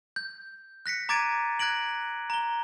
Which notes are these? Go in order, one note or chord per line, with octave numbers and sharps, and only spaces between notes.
G6
F#6 A#6 B6 C#7
A#5 D6 G#6 A6 D7 D#7
F#6 G#6 A#6 D7 F#7
A#5 G7